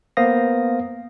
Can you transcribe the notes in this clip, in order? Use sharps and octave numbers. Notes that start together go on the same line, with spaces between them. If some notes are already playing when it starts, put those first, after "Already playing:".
A#3 B3 C5 F5 D#6 A#6